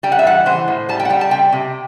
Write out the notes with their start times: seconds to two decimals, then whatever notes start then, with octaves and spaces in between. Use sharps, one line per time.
0.03 G3 G5
0.12 F#5
0.19 E5
0.25 E3 F#5
0.46 E3 C5
0.68 A2
0.89 G3 A5
1.00 G5
1.05 F#5
1.10 G3 G5
1.21 A5
1.31 C3 G5
1.52 C3